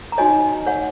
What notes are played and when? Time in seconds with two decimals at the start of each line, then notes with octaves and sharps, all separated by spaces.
0.12 A#5
0.18 D#4 F#4 C#5 D#5 G#5
0.66 C#5 F#5